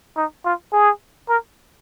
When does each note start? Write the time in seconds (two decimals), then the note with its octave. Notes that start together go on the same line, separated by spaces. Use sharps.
0.17 D#4
0.45 F4
0.73 G#4
1.29 A#4